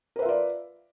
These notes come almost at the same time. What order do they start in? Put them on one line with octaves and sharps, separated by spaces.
A#4 B4 E5 F4 D5